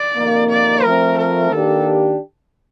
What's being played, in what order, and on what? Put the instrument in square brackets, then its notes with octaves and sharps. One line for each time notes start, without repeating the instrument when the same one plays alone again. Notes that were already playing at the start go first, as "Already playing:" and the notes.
Already playing: [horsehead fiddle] D5
[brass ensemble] F2 C3 D#3 A#3
[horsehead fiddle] D5
[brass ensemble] F3 A3 C4 [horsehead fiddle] A#4
[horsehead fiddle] A#4
[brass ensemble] D#3 A#3 D4 G4 [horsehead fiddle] A4